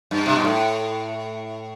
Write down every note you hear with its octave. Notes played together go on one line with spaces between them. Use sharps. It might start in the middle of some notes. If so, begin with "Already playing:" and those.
G2
C3
B2
A2